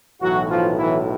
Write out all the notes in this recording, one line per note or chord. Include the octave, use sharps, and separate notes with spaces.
B1 A2 E3 F#3 F#4
F3 F4
E3 E4